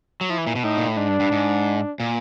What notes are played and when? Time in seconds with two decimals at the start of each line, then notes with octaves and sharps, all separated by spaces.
0.21 F#3
0.29 F3 E4
0.38 E3
0.47 A#2
0.55 B2
0.64 A2 D#4
0.77 A#2
0.88 A2
0.97 G#2 D4
1.08 G2
1.20 G2
1.32 G#2
2.00 A#2